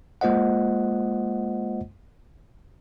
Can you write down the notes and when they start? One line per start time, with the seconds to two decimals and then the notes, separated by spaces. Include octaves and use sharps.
0.21 G#3 A#3 F4 C5 D#5 F#5